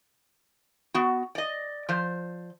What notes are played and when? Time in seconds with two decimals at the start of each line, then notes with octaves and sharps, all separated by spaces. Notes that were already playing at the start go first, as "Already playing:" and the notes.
0.94 B3 F#4
1.35 D5 D#5
1.89 F3 C5